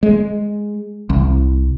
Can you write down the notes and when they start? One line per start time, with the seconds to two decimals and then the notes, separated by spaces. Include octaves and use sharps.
0.03 G#3
1.10 C2